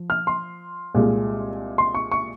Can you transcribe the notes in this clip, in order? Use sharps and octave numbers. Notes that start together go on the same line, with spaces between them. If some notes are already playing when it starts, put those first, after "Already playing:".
Already playing: F3
F6
C6
C2 A#2 G#3
C6
C#6
C#6